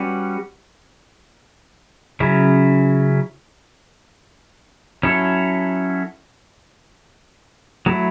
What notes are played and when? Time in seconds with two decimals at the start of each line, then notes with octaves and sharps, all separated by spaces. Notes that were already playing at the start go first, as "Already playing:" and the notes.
Already playing: G3 C#4 F#4 B4
2.20 C#3 F#3 C#4 E4
5.03 F#3 C#4 E4 A4 C#5
7.86 F#3 A3 E4